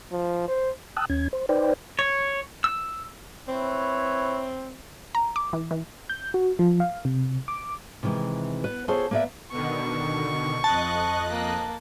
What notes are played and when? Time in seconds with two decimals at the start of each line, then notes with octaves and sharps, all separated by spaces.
0.12 F3
0.48 C5
0.97 G5 A5 D#6 E6 F#6
1.10 D#2 C#4 G#6
1.33 C5
1.49 D#4 B4 C5 D5 G5
1.99 C#5
2.64 E6
3.48 C4 E4 B4 C#5
5.15 A#5
5.36 D6
5.53 E3
5.71 E3
6.10 G6
6.34 F#4
6.59 F3
6.80 F5
7.05 C3
7.48 D6
8.03 C3 D#3 E3 G#3
8.64 B3 B4
8.88 B3 F4 G#4 A4 C5 C#5
9.11 A#3 B3 B4 D5 E5
9.51 B2 D3 D#3 C#6
10.64 F2 D#5 A5 F#6
11.29 A#3